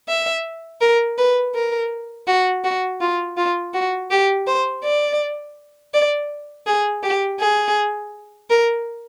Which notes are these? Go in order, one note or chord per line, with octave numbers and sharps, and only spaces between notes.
E5
A#4
B4
A#4
F#4
F#4
F4
F4
F#4
G4
C5
D5
D5
G#4
G4
G#4
A#4